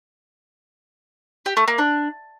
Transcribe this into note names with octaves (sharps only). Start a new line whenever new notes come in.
G4
A3
A#3
D4